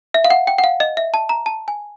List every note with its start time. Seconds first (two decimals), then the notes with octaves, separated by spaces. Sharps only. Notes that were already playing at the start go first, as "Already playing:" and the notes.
0.14 E5
0.24 F5
0.30 F#5
0.47 G5
0.58 F#5
0.64 F5
0.80 D#5
0.97 E5
1.14 A5
1.29 A#5
1.46 A5
1.68 G#5